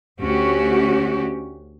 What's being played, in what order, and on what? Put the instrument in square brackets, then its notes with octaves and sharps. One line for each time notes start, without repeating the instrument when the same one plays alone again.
[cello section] D2 C#4 F#4 G4